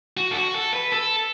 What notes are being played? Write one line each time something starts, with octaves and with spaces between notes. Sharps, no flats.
F#4
A4
F#4
A4
B4
A4